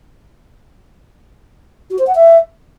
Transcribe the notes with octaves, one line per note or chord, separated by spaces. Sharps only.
F#4
C5
F#5
E5